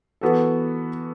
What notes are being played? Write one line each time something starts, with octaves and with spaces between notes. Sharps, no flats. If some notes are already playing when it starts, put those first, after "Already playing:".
E3 B3 F#4 A4